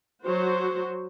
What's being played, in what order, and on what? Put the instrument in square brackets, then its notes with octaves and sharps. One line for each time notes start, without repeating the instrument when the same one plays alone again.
[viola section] F#3 F#4 C5